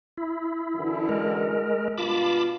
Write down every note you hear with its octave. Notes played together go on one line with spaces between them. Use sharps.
E4
F#2 D3 E3
G#3 A#4
G2 B2 F4 A5 B5 D6